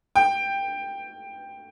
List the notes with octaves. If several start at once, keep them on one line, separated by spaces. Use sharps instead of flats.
G5